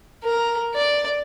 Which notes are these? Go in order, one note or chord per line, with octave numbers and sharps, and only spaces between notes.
A#4
D5